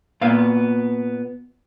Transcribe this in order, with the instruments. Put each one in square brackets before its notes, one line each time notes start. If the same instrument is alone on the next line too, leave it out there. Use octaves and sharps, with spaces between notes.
[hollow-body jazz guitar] A#2 B3 F5